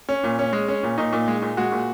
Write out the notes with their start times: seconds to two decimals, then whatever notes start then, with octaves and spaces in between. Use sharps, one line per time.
0.09 C#4
0.24 A#2
0.39 C#4
0.53 G#3
0.68 C#4
0.83 A#2
0.98 A#2 D#4
1.12 A#2
1.28 G#3
1.42 A#2
1.57 G#3 F#4
1.72 A#2